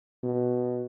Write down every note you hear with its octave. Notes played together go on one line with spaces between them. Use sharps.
B2